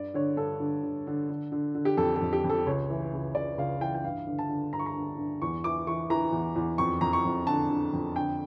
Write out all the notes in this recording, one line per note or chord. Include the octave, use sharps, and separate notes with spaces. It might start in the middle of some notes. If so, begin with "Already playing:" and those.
Already playing: G2 D5
D3 C#5
G2 A4
D3
D3
D3
D3
D3
D3
G4
F2 A4
A4
F2
G4
F2
A4
C#2 C#5
E3
C#2
C#2 D5
C#2 F5
E3 G5
G5
G2 F5
D3
A5
D3
G2 A#5
C#6
A#5
D3
G2
E2 C#6
E3 D6
E3 C#6
E3 A#5
E2
E2
F2 C#6
F2 A#5
C#6
F2
D3 A5
D3
F2
D3 G5